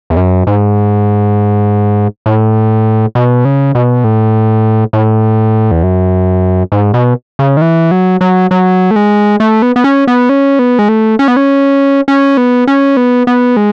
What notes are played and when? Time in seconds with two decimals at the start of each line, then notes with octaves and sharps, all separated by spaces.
0.10 E2
0.17 F#2
0.47 G#2
2.26 A2
3.15 B2
3.45 C#3
3.75 B2
4.04 A2
4.93 A2
5.71 E2
5.83 F#2
6.72 G#2
6.94 B2
7.39 C#3
7.57 D#3
7.62 E3
7.91 F#3
8.21 F#3
8.51 F#3
8.91 A3
8.96 G#3
9.40 A3
9.62 B3
9.76 B3
9.84 C#4
10.07 B3
10.29 C#4
10.59 B3
10.79 G#3
10.89 A3
11.19 C#4
11.28 B3
11.37 C#4
12.08 C#4
12.37 B3
12.67 C#4
12.97 B3
13.27 B3
13.57 G#3